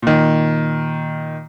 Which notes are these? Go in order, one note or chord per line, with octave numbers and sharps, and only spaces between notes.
A#2 D#3